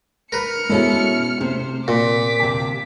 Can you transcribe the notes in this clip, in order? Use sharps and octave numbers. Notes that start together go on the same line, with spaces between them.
A#4 B4 F6 C#7
B2 G#3 C#4 E4 A4 C5
C3 A3 C4 C5
A#2 F4 D6 B6
D2 C3 G5